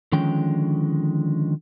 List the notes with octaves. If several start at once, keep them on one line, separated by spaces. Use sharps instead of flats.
D3 D#3 F3 G#3 C#4 G5